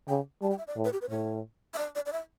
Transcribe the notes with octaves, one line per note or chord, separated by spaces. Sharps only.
C#3 G5
G3 A5
G5
E5
D5
A2
B4
G4
B4
A2 C#5
E5
D5
D5
D5
E5